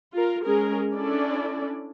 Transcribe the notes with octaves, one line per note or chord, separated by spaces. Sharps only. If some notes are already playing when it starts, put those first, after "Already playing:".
F4 A#4
G#3 C#4 G#4 A#4
C#4 D4 E4 A4 D5